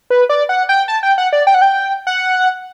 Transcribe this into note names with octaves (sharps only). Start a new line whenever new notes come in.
B4
D5
F#5
G5
A5
G5
F#5
D5
G5
F#5
G5
F#5